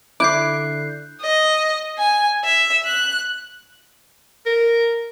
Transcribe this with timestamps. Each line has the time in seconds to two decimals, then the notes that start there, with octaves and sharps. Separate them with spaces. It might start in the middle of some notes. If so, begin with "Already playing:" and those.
0.20 D3 E4 D6 F#6 G6 C7
1.22 D#5
1.98 G#5
2.45 E5
2.85 F#6
4.46 A#4